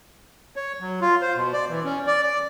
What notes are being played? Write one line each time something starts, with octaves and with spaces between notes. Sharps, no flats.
C#5
F#3
F4
C5
B2
D5
E3
C#4
D5
D5